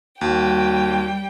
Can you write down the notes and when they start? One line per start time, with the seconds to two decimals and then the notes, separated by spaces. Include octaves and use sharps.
0.21 D#2 G3 F#4 G5